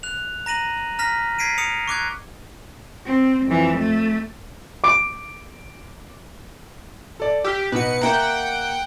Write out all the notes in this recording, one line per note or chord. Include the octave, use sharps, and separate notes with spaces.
F#6 F7
A#5 A#6 D#7 F#7
A#5 F6 A#6 B6
G#6 B6 C7 D7 D#7
D#6 C#7 F7
C#6 D6 F#6 G#6
C4
F2 E3
A3
D6 D7
A4 D5
G4 E6 F6 B6
B2 D#4 F#4 B4 C#7
A#3 E5 F#5 G5 A#5